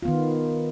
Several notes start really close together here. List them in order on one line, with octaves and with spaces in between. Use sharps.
F4 B3 D#3